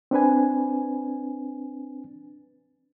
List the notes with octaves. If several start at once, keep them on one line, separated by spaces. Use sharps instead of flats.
C4 D4 B4 G#5